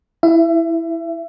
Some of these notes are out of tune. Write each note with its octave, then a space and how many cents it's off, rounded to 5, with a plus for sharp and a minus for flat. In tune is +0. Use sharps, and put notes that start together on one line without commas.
E4 +0 E5 +30